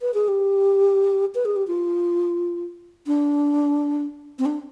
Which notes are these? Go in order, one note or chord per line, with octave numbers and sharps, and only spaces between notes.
B4
G#4
G4
B4
G#4
G4
F4
D4
C4
D4